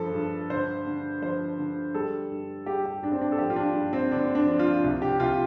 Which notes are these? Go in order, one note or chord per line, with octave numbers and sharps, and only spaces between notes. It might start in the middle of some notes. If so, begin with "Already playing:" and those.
Already playing: G2 F3 A4
G2
D3 C5
D3
F3 C5
D3
G3 A4
G2
G3 G4
G4
G2 D4
C4
D4
A4
F3 G4
F4
D4
G2
C4
D3 D4
D4
F3
F4
C2
G4
C2 F4